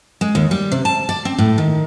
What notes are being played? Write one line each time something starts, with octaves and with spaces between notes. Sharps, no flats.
G#3
D#2
G3
C3
A5
D5
C4
A2
D#3